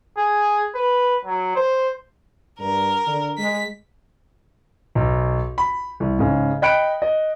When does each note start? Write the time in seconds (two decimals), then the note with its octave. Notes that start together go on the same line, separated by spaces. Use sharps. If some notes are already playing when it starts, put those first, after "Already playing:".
0.18 G#4
0.75 B4
1.26 F#3
1.56 C5
2.59 G2 A#4
3.07 D3
3.38 G#3 B6
4.95 B1
5.58 B5
6.00 C2
6.19 G#2 C#3
6.62 D#5 G5 B5 F#6 C#7 D7
7.02 D#5